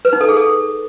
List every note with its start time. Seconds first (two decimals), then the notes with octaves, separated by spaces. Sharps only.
0.05 B4
0.13 D#4
0.21 A4
0.29 G#4
0.37 A4